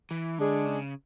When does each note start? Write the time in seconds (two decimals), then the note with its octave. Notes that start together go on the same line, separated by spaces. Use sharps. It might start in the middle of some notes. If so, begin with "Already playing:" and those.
0.11 E3
0.39 D3 G#3 D4 G#4
0.65 C#3